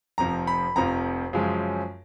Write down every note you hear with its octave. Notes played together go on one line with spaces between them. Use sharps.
F1 F2 F3 A#5
B5
F1 F2 F3 A#5
F#2 C#3 F3 G#3